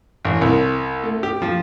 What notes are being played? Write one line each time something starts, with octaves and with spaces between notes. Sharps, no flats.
A1
C2
A3
G4
F3